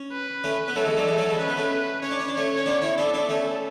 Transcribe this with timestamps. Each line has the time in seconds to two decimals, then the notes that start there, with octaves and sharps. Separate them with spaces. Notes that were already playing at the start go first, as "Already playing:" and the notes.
Already playing: C#4
0.12 B4
0.44 A3 C#4
0.68 B3
0.76 F#3 A3 A4
0.86 E3 G#3
0.97 D3 F#3
1.07 E3 G#3
1.18 F#3 A3
1.28 G#3 B3
1.39 C#4 B4
1.48 B3
1.57 A3 C#4
2.02 C#4 C#5
2.11 D4
2.20 C#4
2.28 D4
2.34 A3 C#4 C#5
2.57 C#4
2.66 B3 D4
2.82 C#4 E4
2.98 B3 D4 A4
3.14 B3 D4
3.29 A3 C#4